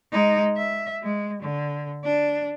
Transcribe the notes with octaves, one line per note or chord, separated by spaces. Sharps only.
G#3 D#4
E5
G#3
D3
D4